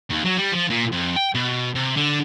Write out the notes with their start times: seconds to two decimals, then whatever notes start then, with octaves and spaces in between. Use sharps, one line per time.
0.10 D#2
0.25 F#3
0.38 G3
0.53 F3
0.70 A#2
0.92 F2
1.16 G5
1.35 B2
1.75 C3
1.96 D3